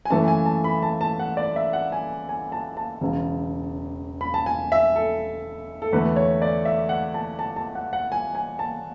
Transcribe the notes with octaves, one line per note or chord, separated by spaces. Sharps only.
G#5
F#2 E3 A3 A5
G#5
A5
B5
A5
A5
F#5
D5
E5
F#5
G#5
G#5
A5
A5
E1 E2 C#3
B5
A5
G#5
E5
A4
A4
E2 D3 A3 B4
C#5
D5
E5
F#5
A5
A5
A5
F#5
F#5
G#5
G#5
A5